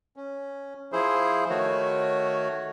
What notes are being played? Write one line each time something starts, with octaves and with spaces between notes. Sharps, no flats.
C#4
F3 E4 G#4 C5
D#3 A3 F#4 C#5